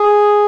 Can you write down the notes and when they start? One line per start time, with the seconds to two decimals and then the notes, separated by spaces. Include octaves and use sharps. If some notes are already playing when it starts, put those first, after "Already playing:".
Already playing: G#4